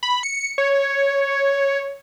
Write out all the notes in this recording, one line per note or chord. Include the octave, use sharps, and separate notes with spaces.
B5
C#7
C#5